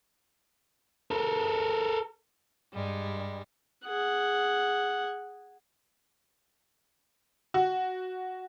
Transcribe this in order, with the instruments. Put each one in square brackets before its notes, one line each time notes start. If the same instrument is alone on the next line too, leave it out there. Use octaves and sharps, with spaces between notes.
[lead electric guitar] A4 A#4
[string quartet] G2 G3 G#3
[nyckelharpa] G#4 F#5
[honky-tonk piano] F#4